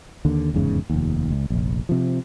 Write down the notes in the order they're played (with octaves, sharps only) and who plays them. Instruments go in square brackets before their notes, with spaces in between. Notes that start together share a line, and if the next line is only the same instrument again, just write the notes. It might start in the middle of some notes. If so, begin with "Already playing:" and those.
[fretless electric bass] D#2 D3
F1 E2 G#2 C#3
F1 D#2
C#2
F1 A#1
C3 F3